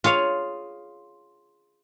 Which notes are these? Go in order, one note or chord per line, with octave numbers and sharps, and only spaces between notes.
F4 G#4 C#5 F5